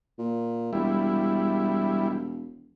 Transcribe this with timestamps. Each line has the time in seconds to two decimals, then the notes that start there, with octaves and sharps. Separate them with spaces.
0.19 A#2
0.73 E1 G3 E4